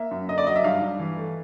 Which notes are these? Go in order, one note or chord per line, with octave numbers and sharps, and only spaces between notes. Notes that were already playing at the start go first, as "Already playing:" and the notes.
Already playing: A#3 E5
F#2
D3 D#5
D5
F#3 D#5
E5
G2 F5
G2
E3
A3